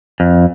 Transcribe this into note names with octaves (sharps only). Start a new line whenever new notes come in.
F2